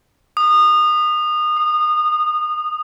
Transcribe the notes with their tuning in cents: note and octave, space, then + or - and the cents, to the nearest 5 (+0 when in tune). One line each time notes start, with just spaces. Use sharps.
D#6 -25
D#6 -10